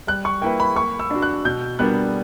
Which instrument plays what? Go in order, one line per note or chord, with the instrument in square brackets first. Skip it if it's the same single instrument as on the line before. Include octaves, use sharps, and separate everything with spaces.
[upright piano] G3 [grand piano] F#6
[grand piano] C#6
[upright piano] A#3 E4 B4 [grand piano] G5
[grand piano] B5
[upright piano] A#3 [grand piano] C#6
[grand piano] E6
[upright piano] D4 F#4
[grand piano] F#6
[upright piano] B2 [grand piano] G6
[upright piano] G3 B3 D4 A#4 [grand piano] F#6